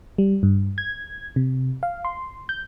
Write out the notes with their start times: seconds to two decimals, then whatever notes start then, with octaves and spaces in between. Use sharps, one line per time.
0.18 G3
0.43 G2
0.78 G#6
1.36 C3
1.83 F5
2.05 C6
2.49 G6